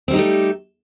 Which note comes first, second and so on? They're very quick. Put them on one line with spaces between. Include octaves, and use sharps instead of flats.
C4 G3 D#4 G4 A3